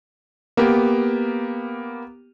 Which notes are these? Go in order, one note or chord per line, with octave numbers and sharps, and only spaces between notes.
A#3 B3 G4